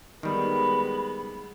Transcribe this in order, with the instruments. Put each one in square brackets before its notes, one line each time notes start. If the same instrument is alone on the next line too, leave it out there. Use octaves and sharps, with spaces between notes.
[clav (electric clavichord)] D#3 G3 [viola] G#3 B3 [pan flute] B5